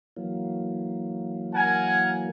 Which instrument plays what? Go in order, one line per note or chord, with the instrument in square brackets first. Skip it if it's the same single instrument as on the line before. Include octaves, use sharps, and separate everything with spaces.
[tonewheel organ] E3 F#3 A#3
[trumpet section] A#4 F#5 G#5